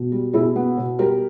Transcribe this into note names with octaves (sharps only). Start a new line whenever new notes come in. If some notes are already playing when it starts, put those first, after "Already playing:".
Already playing: B2
G3
B2 E4 G#4
B3
B2
G3 G4 A#4